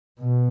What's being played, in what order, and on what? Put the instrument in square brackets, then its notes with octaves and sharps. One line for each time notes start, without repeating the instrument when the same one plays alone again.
[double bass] B2